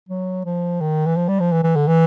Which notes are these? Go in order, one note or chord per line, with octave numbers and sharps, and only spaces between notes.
F#3
F3
D#3
E3
F3
G3
F3
E3
E3
D3
E3